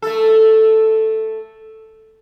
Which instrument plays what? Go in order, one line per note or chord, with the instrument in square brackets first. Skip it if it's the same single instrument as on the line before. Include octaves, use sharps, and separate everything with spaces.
[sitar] A3 A4